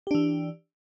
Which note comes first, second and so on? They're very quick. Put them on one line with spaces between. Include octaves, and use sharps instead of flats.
G4 D4 E3